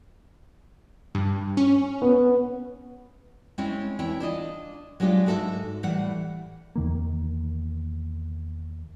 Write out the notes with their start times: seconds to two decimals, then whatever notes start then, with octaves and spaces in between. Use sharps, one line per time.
1.15 G2
1.57 C#4
2.02 B3
3.58 G#3 C4 C#4 E4 C#5
3.99 E2 E4 C#5 G5
4.20 D4 F4 D#5
5.00 F#3 G#3 D4 F4 G4
5.26 G#2 F#4 A4 C5 E5
5.83 A2 E3 G3 F#5
6.76 E2 D#3 A#3